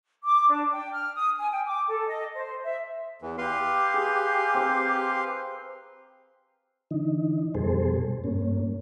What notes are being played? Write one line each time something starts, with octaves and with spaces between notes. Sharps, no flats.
D6
D4
G5
F6
D#6
G#5
G5
D6
A4
D#5
C5
E5
E2 E3
G4 B4 F5 C6
G#4
C4 A#4
D3 E3 D#4
F2 B2 G3 G#4 A4 C5
G2 A#3 C#4